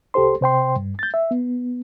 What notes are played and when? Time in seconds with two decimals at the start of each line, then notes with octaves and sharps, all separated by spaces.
0.14 C2 G4 A4 C5 C6
0.41 C3 C5 G5 C6
0.76 G2
0.99 G6 A6
1.14 E5
1.31 B3